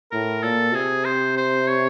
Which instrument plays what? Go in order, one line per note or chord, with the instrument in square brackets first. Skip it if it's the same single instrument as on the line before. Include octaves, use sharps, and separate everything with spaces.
[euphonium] A2 [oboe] A#4
[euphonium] A#2 [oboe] A4
[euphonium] C3 [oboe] G#4
[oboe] C5
C5
C#5